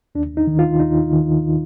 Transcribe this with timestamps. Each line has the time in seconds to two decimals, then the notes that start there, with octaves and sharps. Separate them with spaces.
0.15 D#2 D4
0.37 D#4
0.47 D#3
0.59 F4
0.80 D#2 D#4
1.12 D#3